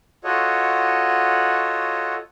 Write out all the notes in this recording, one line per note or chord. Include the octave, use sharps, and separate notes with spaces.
F4 F#4 A4 C#5 D#5 F#5